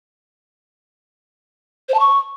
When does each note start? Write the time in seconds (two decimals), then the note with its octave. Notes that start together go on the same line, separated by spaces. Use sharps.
1.89 C5
1.94 A5
2.00 C#6